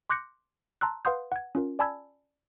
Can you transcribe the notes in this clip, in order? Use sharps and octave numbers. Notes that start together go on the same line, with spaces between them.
C6 D6 F#6 G6 A#6 C#7
A5 A#5 C6 E6 F#6
B4 F5 F#5 C6 D#6 G6
F#5 G#6
C#4 F4 A#4
D5 G#5 A5 B5 E6 G#6